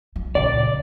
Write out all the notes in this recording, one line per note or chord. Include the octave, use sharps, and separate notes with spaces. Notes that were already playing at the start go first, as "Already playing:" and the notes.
F#3
C#2 A#2 D5